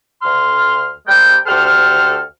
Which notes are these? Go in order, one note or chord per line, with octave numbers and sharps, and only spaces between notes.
D2 C6 F6
C3 G3 G#3 A#4 D5 G5
D2 G4 A4 C5 F6